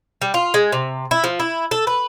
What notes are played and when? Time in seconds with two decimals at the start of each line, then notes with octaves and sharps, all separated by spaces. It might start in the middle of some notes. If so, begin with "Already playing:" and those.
0.22 G3
0.34 F4
0.54 G#3
0.72 C3
1.11 E4
1.24 F3
1.40 E4
1.71 A4
1.87 B4